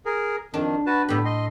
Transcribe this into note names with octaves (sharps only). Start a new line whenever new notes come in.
G#4 A#4
F2 D#3 D4
F#4 B4 A5
A2 D3 B3 G4 B5
D#5 C6